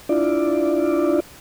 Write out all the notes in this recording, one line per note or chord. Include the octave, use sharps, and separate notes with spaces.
D4 E4 F4 D5